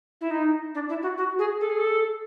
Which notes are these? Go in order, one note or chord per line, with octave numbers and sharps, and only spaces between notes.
E4
D#4
D4
E4
F#4
F#4
G#4
A4
G#4
A4